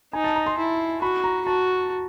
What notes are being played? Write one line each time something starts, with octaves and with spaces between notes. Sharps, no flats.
D#4 G#5
A5
A#5
C6
E4
F#4 B5
A#5
F#4 A5